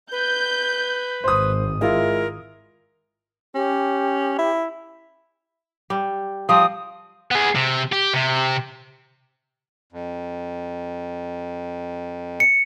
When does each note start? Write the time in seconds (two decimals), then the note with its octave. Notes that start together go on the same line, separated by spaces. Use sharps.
0.12 B4 G6
1.24 G#1 C5 D#6
1.81 G#3 E4 F4 A#4
3.55 C#4 G4
4.38 E4
5.90 G3
6.49 F3 G3 C4 D#6
7.31 B3 G#4
7.55 C3
7.92 G4
8.14 C3
9.93 F2
12.40 C#7